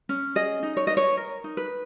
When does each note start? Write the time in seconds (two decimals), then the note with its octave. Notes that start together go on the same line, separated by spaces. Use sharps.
0.09 C#4
0.35 G#4 D#5
0.63 D#4
0.77 C#5
0.87 B4 D#5
0.97 C#5
1.17 A#4
1.44 D#4
1.57 B4